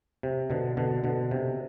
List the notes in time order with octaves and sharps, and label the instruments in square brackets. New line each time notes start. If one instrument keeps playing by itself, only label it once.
[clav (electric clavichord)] C3
B2 D3
B2 D3
B2 D3
C3